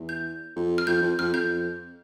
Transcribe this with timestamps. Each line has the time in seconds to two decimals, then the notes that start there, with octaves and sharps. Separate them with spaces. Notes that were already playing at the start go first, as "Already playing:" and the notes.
Already playing: E2
0.09 G6
0.56 F2
0.78 F6
0.87 F2 G6
1.02 F2
1.19 F2 F6
1.34 F2 G6